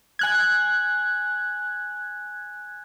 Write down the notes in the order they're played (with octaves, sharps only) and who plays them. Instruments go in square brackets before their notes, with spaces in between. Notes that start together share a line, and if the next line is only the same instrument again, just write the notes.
[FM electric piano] G#5 F#6 G#6